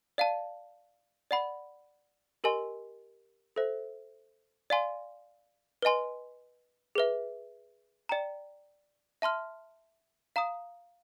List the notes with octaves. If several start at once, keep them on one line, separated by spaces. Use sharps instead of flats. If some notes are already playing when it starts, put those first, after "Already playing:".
D5 F5 A5
D5 F#5 B5
G4 A#4 D#5 G#5 C6
A4 C5 E5
D5 F5 G#5 C6
B4 D#5 G#5 C6
G#4 B4 E5
D5 G5 A#5
E5 A5 C6 F6
F5 A#5 D#6